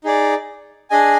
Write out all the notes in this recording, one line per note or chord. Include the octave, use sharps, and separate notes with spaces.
D#4 G#4 D5
D4 G#4 D#5 G#5